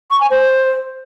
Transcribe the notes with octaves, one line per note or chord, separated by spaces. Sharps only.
C#6
G#5
C5